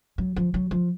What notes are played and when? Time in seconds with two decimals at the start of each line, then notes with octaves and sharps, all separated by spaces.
0.18 F#3
0.36 F3
0.54 F#3
0.71 F3